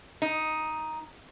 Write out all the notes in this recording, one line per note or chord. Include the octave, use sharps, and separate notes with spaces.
D#4